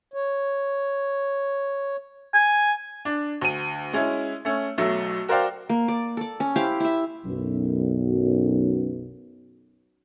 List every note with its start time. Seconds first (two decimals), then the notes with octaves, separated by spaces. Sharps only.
0.14 C#5
2.34 G#5
3.05 D4
3.41 D2 D#7
3.93 G#3 C#4 E4
4.45 A3 C#4
4.78 B1 F#3 A3
5.28 F#4 A#4 C5 D5 F5 G5
5.69 A#3
5.88 D5
6.17 A4 D5
6.40 C#4
6.56 E4 G4 C5 F5
6.80 E4 E5
7.26 B1 F#2